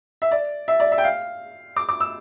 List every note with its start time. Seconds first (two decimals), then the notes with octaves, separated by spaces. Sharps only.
0.22 E5
0.31 D5
0.68 E5
0.80 D5
0.92 E5
0.98 G5
1.04 F5
1.77 D6
1.89 D6
2.00 E6